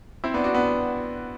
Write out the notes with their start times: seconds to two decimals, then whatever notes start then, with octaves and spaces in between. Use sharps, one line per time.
0.24 C4 E4
0.34 B3 D4
0.44 D4 F#4
0.54 B3 D4